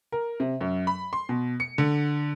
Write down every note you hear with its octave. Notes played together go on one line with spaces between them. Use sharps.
A#4
C3
F#2
B5
C6
B2
C#7
D3